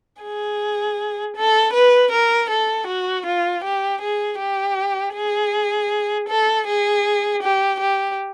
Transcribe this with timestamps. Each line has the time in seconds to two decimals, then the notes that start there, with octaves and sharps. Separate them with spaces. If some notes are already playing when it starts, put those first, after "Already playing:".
0.22 G#4
1.36 A4
1.73 B4
2.11 A#4
2.50 A4
2.87 F#4
3.25 F4
3.64 G4
4.01 G#4
4.39 G4
5.15 G#4
6.29 A4
6.67 G#4
7.43 G4
7.80 G4